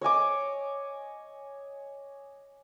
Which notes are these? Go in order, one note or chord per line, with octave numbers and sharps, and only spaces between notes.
C#5 D#5 G#5 D6